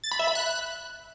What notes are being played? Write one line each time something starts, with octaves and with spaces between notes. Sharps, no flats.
A6
B5
E5
B5
F#6